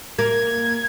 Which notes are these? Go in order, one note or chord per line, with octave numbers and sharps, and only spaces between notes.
A#3 G#6